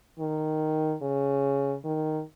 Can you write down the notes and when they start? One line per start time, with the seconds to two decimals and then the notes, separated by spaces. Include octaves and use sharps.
0.19 D#3
1.02 C#3
1.84 D#3